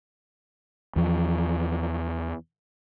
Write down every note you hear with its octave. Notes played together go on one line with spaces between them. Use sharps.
E2 F3